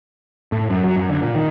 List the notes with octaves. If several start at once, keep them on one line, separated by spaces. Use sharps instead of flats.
A2
F#2
F#3
F#2
D3
A#2
D#3